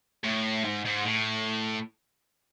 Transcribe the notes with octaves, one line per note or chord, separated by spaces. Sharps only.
A2
G#2
G#2
A2